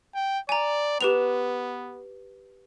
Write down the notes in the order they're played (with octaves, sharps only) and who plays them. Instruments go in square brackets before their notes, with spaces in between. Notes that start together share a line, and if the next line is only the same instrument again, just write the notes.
[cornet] G5
[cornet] D5 [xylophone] G#5 A#5
[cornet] B3 [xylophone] G4 B4 F7